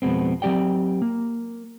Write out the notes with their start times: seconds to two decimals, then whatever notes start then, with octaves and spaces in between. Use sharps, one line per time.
0.02 F2 B2 G#3 B3 C4
0.42 F#3 C4 G4 D5 G5
1.02 A#3